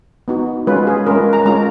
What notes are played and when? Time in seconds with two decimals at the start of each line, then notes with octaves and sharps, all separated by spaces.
0.28 B3 D#4 F#4
0.67 G#3 C#4 F4 B4
0.87 G#4
1.06 G#3 C#4 F4 A#4
1.33 A#5
1.46 G#3 C#4 F4 A#5